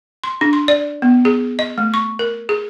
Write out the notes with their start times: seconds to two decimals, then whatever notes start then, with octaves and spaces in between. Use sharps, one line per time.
0.24 C6
0.41 D4
0.53 C6
0.68 D5
1.02 B3
1.25 G#4
1.59 D#5
1.78 A3
1.94 C#6
2.19 A#4
2.49 G#4